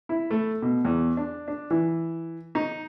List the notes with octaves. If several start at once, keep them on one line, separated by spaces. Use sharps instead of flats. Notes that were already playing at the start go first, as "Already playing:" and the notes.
E4
A3
B2
E2
D4
D4
E3
D#4